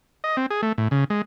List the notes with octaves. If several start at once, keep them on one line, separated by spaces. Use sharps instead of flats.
D#5
C4
G#4
A3
A2
C#3
G#3